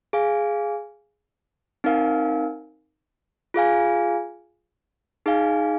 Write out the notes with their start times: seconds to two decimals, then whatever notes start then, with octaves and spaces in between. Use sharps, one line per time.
0.13 G#4 F5 G#5
1.84 C4 D#4 A#4 F5 G#5
3.54 F4 G#4 F5 G#5
5.26 D#4 G#4 F5 G#5